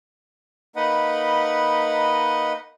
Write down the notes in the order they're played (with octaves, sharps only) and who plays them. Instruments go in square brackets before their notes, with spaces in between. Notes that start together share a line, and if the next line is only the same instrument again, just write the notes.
[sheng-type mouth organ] A#3 D#4 B4 D#5 F#5 B5